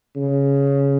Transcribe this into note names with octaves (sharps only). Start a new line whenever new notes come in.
C#3